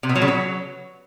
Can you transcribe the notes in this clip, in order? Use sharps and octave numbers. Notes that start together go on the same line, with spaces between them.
C3
B2
F#3
C#3
F#3